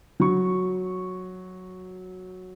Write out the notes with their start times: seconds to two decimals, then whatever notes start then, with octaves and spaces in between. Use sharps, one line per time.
0.20 F#3 C#6